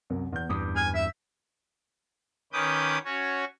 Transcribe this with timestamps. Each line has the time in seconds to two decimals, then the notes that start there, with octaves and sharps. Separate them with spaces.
0.10 C2 F#2
0.33 E2 G6
0.49 E2 G2 D6 D#6
0.76 G#5 F6
0.94 E5
2.53 D#3 C#4 B4 D6 D#6 G6
3.05 C#4 F#4 C#5